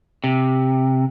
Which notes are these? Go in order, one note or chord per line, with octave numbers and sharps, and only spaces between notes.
C3